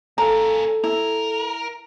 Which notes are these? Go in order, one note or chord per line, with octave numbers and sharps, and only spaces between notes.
A#3 C#4 A4 A#5
E4 A#4